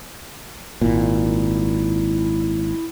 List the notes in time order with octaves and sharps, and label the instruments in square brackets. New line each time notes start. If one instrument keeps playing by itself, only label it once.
[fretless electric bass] G#1 A#2 [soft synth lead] E4